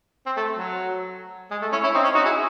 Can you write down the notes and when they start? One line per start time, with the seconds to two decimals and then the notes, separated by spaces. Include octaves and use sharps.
0.26 C4
0.37 A3
0.58 F#3
1.51 G#3
1.62 A3
1.72 C#4 E4
1.83 C#4 E4
1.94 C4 D#4
2.04 C#4
2.15 D#4 F#4
2.25 E4 G#4